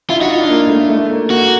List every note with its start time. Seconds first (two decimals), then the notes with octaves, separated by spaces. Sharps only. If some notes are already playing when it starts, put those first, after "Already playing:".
0.09 E4 F4
0.19 D#4 F#4
0.29 F4
0.39 D4
0.49 A#3
0.69 A3
0.89 A3
1.10 A#3
1.29 A#3 F#4
1.43 A#3